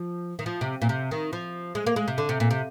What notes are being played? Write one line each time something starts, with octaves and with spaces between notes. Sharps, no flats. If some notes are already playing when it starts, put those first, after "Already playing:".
Already playing: F3
D#3
F3
C3
A#2
C3
D#3
F3
G#3
A#3
G#3
C3
D3
C3
A#2
C3